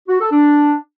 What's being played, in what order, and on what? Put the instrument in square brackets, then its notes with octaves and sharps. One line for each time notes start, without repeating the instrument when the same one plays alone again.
[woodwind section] F#4
A4
D4